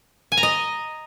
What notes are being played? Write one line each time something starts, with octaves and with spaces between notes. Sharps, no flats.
G#5
A#5
D#5